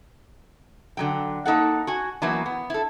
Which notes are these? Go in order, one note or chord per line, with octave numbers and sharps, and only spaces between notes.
D3 F#3 G5
A#3 D#4 A4 F#5
F#4 G#5
E3 F#3 A#3 B3 E4
B3
E4 A4